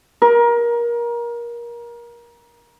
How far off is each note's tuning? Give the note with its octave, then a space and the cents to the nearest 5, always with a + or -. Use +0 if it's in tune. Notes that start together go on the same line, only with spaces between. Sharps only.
A#4 +25